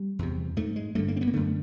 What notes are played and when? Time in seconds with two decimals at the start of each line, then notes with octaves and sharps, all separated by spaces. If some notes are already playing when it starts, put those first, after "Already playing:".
Already playing: G3
0.19 E2 C3
0.57 G#2 A3
0.76 G#3
0.95 G2 D3 A3
1.08 A#3
1.16 C4
1.21 B3
1.28 A#3
1.33 F#2 D3 A3